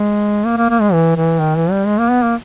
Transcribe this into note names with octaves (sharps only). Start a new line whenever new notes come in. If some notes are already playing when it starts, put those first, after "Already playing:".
Already playing: G#3
A#3
A#3
A#3
G#3
E3
E3
D#3
E3
G3
G#3
A#3
B3
A#3